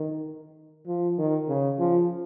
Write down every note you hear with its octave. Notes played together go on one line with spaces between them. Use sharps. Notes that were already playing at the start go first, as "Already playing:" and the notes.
Already playing: D#3
F3
D#3
C#3
F3